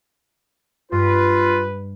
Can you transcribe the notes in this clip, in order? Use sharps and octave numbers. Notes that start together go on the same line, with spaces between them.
G2 F4 B4